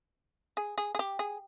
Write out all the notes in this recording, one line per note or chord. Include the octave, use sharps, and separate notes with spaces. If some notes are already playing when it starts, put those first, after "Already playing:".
G#4
G#4
G#4
G4
G#4